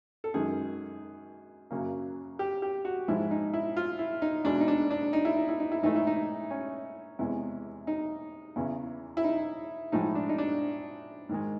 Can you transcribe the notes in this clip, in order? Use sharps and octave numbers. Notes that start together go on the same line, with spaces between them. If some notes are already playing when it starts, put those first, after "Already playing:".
A4
F#2 D#3 G#3 G#4
F#2 C#3 F#3 A#3
G4
G4
F#4
G#2 F3 G#3 E4
D#4
E4
F4
E4
D#4
E2 B2 G#3 D4
D#4
D4
D4
D#4
E4
D#4
E4
D#4
E4
G#2 E3 A3 D#4
E4
D#4
C#4
E2 C3 E3 G#3
D#4
E2 C#3 E3
E4
D#4
A2 F3 G#3 D#4
D4
D#4
D4
G#2 D#3 G#3